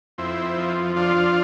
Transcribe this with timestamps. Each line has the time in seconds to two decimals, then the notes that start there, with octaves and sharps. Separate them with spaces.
0.18 F2 C4 E4
0.58 F3
0.96 F3 D4 F4